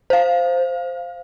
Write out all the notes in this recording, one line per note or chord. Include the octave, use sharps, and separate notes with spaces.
C5 F5